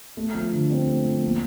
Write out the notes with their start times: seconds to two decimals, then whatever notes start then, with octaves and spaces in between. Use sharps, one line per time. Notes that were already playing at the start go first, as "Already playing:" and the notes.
0.17 A3
0.35 F3
0.53 D3
0.70 C4
0.88 A3
1.05 F3
1.23 A#3